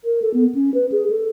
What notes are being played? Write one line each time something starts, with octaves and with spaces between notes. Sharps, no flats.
A#4
A4
B3
C#4
B4
G#4
A4